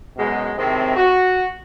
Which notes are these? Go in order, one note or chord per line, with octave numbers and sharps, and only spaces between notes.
F#2 B2 G#3
A2 C3 D#3 G#3 C4
F#4